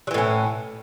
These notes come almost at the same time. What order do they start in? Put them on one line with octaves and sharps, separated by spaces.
F#3 E3 A2 C#4